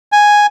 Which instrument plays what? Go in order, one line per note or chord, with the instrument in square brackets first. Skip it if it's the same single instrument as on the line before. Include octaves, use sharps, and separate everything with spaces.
[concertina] G#5